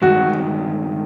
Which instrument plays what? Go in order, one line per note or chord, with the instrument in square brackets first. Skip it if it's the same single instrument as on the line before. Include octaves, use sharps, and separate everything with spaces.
[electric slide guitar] G2 D#3 G#3 [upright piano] F#4